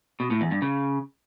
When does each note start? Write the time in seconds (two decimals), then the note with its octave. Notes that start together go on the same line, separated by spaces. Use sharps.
0.20 B2
0.30 A2
0.41 E2
0.51 G2
0.62 C#3